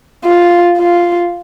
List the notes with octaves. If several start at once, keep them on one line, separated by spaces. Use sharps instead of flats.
F4
F4